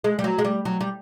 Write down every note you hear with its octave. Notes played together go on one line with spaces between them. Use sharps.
G#3
G3
F#3
G#3
G3
F#3
G3